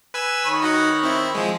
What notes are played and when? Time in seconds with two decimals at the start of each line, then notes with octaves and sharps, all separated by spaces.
0.14 B4 G#5 E6
0.45 D#3 C#5 B5
0.62 D#4 F#4 F#5
1.03 C4 E4
1.35 F3 G#3